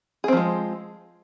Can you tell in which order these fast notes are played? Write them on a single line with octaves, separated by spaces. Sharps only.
G#4 C4 F3 G#3